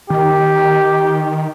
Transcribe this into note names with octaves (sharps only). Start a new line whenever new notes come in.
D#3 G4